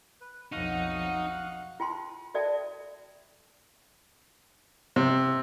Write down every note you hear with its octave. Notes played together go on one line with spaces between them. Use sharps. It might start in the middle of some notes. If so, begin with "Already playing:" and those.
B4
B1 F2 D#4 F#4 F5 F#5
F4 G5 A5 C6
F#4 A4 D5 E5 G5 A5
C3